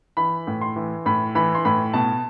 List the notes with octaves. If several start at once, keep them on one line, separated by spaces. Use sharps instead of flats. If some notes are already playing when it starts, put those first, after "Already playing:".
E3 B5
A2
C6
E3
A2 B5
E3 B5
C6
A2 B5
B2 A5